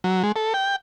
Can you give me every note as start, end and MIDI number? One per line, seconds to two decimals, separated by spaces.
0.04 0.23 54
0.24 0.32 56
0.36 0.53 69
0.54 0.76 79